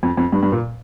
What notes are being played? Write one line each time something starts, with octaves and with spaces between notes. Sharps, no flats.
F2
F2
G2
G2
A#2